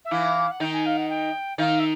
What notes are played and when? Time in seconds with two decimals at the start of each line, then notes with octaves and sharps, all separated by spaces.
0.05 E5
0.11 E3 E4 F5
0.51 F#5
0.60 D#3 D#4 G5
0.72 G#5
0.85 F5
0.96 F#5
1.09 G5
1.58 D#3 D#4 F5
1.79 E5